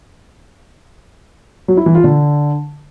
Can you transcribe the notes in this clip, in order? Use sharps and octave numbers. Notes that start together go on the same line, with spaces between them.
F#3
E4
E3
F4
D3